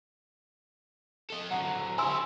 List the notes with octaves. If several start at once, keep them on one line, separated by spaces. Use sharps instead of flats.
A4 D#5
D3 F#3 F#5
E4 G4 G#5 C6 E6